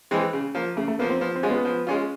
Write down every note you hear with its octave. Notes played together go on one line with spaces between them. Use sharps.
E3 G#3 C4
C#3
F3 A#3
C#3 A3
A3
F3 A#3 B3
C4
F3 B3
C4
G#3 C#4 F4
B3
F3
G#3 C#4 F4